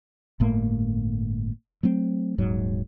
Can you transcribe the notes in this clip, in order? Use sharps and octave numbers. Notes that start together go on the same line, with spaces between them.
G1 A2 A3 A#3
F#3 A3 C4
D#1 G#2 F#3